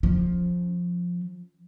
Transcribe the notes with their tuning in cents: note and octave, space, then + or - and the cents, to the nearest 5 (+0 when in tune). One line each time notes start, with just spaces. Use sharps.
F3 +15 C#4 +10